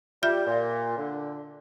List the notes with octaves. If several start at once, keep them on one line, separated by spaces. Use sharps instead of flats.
G3 F4 E5 G6
A#2
D3